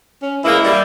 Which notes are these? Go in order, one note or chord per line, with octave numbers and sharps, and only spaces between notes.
C#4
E3 G#3 A#3 E4
G3